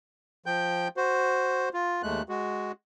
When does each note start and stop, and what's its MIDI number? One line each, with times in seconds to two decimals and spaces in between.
0.46 0.88 53
0.46 0.88 79
0.46 0.88 91
0.97 1.69 66
0.97 1.69 72
1.74 2.02 65
2.03 2.23 39
2.03 2.23 56
2.03 2.23 57
2.03 2.23 90
2.29 2.72 56
2.29 2.72 66